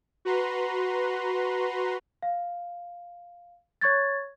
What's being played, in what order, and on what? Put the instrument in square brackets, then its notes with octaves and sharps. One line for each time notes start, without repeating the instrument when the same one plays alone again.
[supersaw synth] F#4 B4 A#5 C6
[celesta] F5
C#5 C#6 G#6 A6